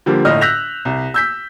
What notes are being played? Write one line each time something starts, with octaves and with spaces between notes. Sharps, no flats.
D3 F3 G3 A#3
G1 A2 D#5 F6
E6 F#6 G6 A#6 B6 F7
C2
E6 G6 B6